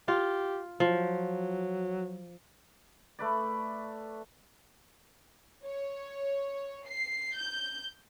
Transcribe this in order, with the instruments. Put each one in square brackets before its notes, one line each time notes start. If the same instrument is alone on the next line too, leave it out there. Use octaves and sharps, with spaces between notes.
[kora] F4 [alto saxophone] G4
[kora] F3 [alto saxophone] F#3
[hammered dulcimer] A3 B4 D5
[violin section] C#5
C7
G6